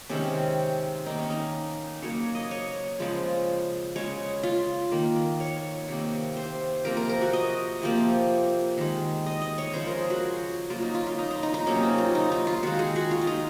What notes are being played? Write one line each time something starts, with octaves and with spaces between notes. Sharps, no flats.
C3 D#3 G#3 C#4
D#3 A#3 D#4
C#4
D#4
C#3 F#3 A#3 C#5
D#5
C#5
C#3 F3 G#3
C#3 G#3 C#5
F4
D#3 A#3
C#5
C3 D#3 A#3
C5
C3 F3 A#3 A#4
A#4
A#4
F#4
D#5
C3 F3 A#3
D#3 G#3
D#5
D#5
C#5
C#3 F3 G#3 C5
A#4
G#4
F#4
C#3 F#3 A#3 F4
D#4
F4
F4
D#4
D#4
D#4
D#4
C3 F#3 A#3 C#4
D#4
F4
D#4
D#4
F4
D#3 G#3 F#4
G#4
F#4
F4
F4
D#4